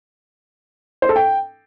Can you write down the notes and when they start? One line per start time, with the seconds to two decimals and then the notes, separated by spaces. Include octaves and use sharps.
1.02 C5
1.09 A4
1.16 G5